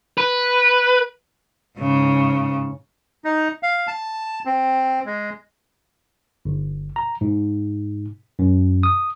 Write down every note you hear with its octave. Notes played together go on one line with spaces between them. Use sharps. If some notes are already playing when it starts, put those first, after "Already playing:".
B4
G#2 C#3
D#4
F5
A5
C4
G#3
G1
A#5
G#2
F#2
D#6